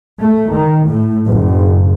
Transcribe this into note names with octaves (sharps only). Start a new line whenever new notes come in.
A3
D#3
A2
F#1